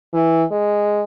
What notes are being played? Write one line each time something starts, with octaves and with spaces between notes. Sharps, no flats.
E3
G#3